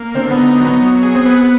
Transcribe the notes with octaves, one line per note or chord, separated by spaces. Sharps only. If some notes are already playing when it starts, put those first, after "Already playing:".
Already playing: A#3
D3 C4
B3
D#4
B3
F#3
B3
F#3
G#4
C4
B3